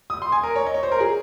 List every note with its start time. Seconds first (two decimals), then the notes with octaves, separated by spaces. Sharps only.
0.10 D#6
0.22 C6
0.32 G#5
0.43 A#4
0.56 C#5
0.67 D#5
0.74 C#5
0.83 C5
0.91 A#4
1.00 G#4